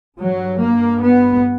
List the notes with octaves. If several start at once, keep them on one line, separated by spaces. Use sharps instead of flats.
G2 F#3
A#3
B3